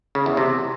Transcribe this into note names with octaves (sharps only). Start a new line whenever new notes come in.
C#3
E2
C3